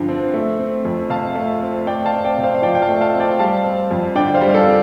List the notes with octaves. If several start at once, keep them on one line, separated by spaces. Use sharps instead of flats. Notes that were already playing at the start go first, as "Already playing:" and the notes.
Already playing: G2 D3 F3
C4
A3
C4
F2
C3 F5 A5
A3
C4
A3 D5 G5
F5 A5
C4
D5 G5
C3
C5 F5
F5
F3 D5 G5
G5
F5 A5
A3
F5 A5
C4
D5 G5
G3 F5 A5
C4
F2
D3 D5 G5
C5 F5
G3
F5
A4 D5
C4